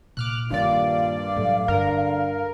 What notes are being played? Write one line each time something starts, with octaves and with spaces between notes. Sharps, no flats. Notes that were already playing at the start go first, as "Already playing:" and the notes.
A#2 D6 F6 F#6
G2 A#2 D#3 E4 D5 F5
A2 F#3 A3
G2 D3 A#4